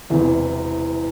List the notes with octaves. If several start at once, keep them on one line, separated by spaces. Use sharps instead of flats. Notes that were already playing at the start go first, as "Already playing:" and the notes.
E1 E2 C3 E3